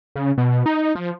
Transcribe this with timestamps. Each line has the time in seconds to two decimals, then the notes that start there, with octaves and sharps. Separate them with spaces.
0.16 C#3
0.38 B2
0.66 D#4
0.95 F3